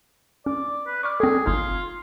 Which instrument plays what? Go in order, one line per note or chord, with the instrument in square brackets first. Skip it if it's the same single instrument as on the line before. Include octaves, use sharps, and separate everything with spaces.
[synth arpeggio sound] C#4 [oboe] D5
[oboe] B4
[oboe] D5 [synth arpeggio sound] C#6 D6 F6
[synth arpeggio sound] C4 A4 [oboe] G#4
[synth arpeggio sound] G1 D#4 [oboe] F4